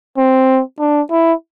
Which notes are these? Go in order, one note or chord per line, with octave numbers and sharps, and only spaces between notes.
C4
D4
E4